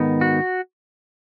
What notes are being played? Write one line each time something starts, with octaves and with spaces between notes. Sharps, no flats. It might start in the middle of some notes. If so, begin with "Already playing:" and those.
Already playing: G#2 D#3 B3 D#4
F#4